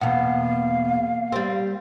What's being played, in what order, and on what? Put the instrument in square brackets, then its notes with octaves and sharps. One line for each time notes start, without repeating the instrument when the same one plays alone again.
[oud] E2 B2 [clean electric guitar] A#3 F#5 [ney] F5
[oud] G3 C4